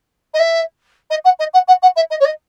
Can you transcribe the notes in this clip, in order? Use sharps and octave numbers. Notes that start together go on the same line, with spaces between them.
D#5
E5
D#5
F#5
D#5
F#5
F#5
F#5
E5
D#5
C#5
D#5